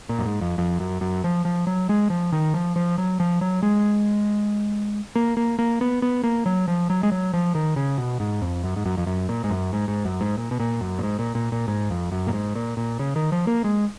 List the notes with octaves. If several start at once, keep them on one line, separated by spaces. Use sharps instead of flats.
A#2
F#2
G#2
F2
F2
F#2
F#2
F3
F3
F#3
G#3
F3
D#3
F3
F3
F#3
F3
F#3
G#3
A#3
A#3
A#3
B3
B3
A#3
F#3
F3
F#3
G#3
F#3
F3
D#3
C#3
B2
G#2
F2
F#2
G#2
F#2
F2
F#2
A#2
G#2
F#2
G#2
G#2
F#2
G#2
A#2
B2
A#2
F#2
A#2
G#2
A#2
A#2
A#2
G#2
F2
F#2
A#2
G#2
A#2
A#2
C#3
D#3
F3
A#3
G#3